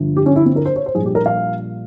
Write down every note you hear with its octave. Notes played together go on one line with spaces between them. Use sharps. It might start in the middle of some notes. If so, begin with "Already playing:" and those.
Already playing: G1 G2 F3
G4
C#4
E4
C4
A#4
C5
C#5
C5
A#1 A#2 G3 G#4
G4
A#4
F5